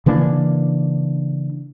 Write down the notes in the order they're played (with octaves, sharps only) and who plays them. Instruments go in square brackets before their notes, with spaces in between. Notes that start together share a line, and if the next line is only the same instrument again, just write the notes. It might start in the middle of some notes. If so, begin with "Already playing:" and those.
[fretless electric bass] C#3 E3 A#3 D4